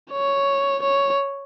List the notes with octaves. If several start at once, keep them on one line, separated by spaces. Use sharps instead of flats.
C#5
C#5